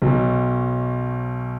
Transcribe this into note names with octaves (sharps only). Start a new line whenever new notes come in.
B1 B2 F#3